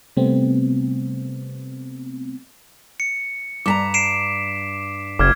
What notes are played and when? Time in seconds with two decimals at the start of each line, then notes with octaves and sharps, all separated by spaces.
0.16 C3 G3 A3 B3 C4
3.00 C#7
3.66 G2 A5 A#5 D6 B6
3.94 C7 D7 E7
5.19 F#1 D6 F6 G#6